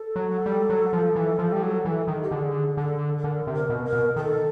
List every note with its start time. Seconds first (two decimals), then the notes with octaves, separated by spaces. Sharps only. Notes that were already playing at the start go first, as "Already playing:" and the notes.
Already playing: A4
0.16 F#3
0.46 G3
0.70 F#3
0.93 F3
1.16 E3
1.39 F3
1.52 G3
1.62 F#3
1.85 E3
2.08 D#3
2.23 G4
2.31 D3 G#4
2.77 D3 A4
3.17 A4
3.24 D3 A#4
3.47 C3
3.54 A#4
3.69 B2
3.85 A#4
3.93 B2
4.16 D#3 A4